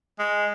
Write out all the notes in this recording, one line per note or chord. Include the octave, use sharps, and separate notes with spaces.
G#3